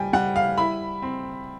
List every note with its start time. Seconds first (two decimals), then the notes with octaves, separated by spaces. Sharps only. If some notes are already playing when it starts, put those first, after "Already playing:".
Already playing: G3 G5 G#5
0.13 G3 F#5
0.36 F5
0.58 E4 B5
1.02 C4